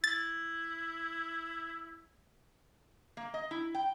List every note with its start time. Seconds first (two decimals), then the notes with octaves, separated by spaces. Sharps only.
0.04 E4 A6
3.17 A#3
3.34 D#5
3.51 E4
3.75 G5